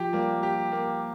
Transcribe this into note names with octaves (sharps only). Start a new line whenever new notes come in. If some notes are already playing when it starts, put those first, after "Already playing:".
Already playing: F3 G4
G3 A#3
G4
A#3